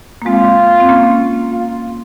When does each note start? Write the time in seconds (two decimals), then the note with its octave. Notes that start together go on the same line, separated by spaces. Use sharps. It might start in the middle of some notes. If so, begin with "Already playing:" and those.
0.22 A#3
0.26 G#3 C4 F4
0.80 C4
0.89 A#3 C#4
1.52 F4